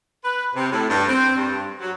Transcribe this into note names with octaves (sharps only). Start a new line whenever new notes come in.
B4
C3
A2
G2
C4
G2
F#3